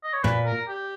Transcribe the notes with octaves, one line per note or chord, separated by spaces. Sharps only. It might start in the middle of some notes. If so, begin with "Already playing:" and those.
D#5
C#5
A#2 B4
A#4
G4